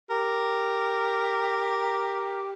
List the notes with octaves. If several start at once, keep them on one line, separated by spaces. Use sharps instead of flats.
G4 A#4